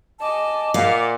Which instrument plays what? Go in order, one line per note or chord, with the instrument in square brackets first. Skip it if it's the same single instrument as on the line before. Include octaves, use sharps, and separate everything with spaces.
[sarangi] D#5 [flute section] G#5 A5 D6
[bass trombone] A#2 [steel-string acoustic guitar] F5 [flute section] F#5 D6